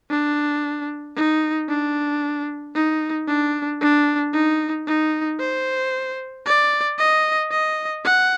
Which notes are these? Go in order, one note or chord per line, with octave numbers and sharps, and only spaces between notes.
D4
D#4
D4
D#4
D4
D4
D#4
D#4
C5
D5
D#5
D#5
F#5